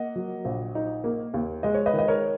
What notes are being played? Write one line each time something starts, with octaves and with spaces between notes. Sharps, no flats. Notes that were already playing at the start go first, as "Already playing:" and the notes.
Already playing: A#3 D#5 F#5
F#3
A#1
D#4
A#3
D#2
G#3 D#5
C#5
B4 D#5
D#3
D#5
A#4 C#5